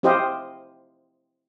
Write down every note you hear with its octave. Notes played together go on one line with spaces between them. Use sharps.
C4 E4 G4 C5 D#5 F5